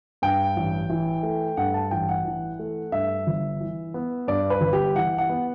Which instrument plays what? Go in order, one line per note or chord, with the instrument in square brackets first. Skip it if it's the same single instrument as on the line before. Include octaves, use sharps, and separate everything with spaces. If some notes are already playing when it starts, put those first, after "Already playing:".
[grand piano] G2 G5
A1
E3
A3
G2 F#5
A5
A1 G5
F#5
E3
A3
G2 E5
G1
E3
B3
G2 D5
B4
G1
G4
E3 F#5
F#5
B3